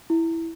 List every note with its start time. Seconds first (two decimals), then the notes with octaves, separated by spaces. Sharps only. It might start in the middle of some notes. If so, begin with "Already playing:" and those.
0.10 E4